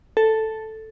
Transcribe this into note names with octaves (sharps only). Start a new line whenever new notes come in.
A4